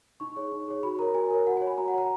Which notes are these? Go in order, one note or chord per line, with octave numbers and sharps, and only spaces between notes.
D#4 C#6
G#4 C#5
D#4
G#4 C#5
F#4 B5
A#4 C#5 A#5
F#4 G#5
A#4 C#5
F#4 F#5
G#5
C#5
B5
F#4 A#5
F#5
C#5 A#5